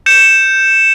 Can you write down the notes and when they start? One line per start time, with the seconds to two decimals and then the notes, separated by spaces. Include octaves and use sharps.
0.06 G6 C#7 E7